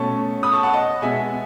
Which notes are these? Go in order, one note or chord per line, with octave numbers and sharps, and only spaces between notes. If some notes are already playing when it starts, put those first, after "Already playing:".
Already playing: B2 A3 C#4 A5 C#6
B5 D#6
A5 C#6
F#5 A5
D#5 F#5
B2 G#3 B3 E5 G#5